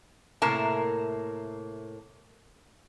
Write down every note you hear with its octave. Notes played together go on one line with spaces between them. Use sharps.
A2 C3 A#3 A#4 A5